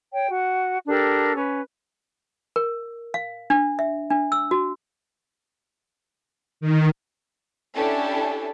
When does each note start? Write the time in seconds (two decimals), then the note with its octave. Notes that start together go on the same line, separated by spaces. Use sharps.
0.12 C#5 G5
0.31 F#4
0.88 D4 G4 A4 A#4
1.34 C#4 B4
2.56 A#4
3.14 F5
3.50 D4
3.79 E5
4.10 D4
4.32 E6
4.51 F#4
6.61 D#3
7.74 C#4 D4 E4 G4 A4